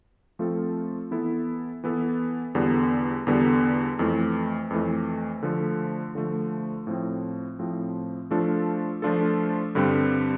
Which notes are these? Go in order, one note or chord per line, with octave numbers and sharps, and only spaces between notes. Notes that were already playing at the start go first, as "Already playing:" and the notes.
F3 A3 C4 F4 A4
E3 B3 E4 A4
E3 B3 E4 A4
E2 D3 G3 B3
E2 D3 G3 B3
F2 E3 A3
F2 E3 A3
D3 F3 A3
D3 F3 A3
A2 F3 C4
A2 F3 C4
F3 A3 D4 F4 A4
F3 A3 D4 F4 A4
G2 D3 G3 C4